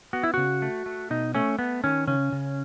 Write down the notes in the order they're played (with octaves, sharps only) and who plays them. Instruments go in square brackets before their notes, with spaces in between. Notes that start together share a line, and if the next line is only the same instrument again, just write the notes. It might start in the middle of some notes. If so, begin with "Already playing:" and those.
[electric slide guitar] B3 F#4
E4
C#3 F#4
A3
A3
B2 D#4
A3 C#4
A3 B3
D#3 C#4
C#3 C#4
C#3